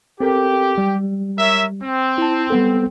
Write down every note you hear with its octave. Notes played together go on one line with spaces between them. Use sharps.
C4 G4 A4 A#4
G3
A#4 C#5 E5
C4
E4 A5
G3 B3 A4